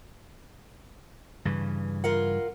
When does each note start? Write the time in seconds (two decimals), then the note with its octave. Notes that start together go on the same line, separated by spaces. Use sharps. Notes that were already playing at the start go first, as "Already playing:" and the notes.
1.45 G2 C#3 E3
2.04 F4 A#4 F#5